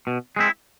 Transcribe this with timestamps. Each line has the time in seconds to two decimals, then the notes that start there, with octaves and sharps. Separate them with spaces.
0.07 B2
0.36 G#3 C4 E4